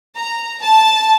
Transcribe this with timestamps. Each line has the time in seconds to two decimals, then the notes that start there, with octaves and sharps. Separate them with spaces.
0.15 A#5
0.62 A5